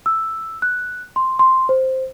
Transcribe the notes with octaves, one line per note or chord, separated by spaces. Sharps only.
E6
F#6
C6
C6
C5